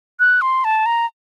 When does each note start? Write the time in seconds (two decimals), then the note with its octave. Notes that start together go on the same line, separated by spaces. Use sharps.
0.20 F#6
0.42 C6
0.64 A5
0.86 A#5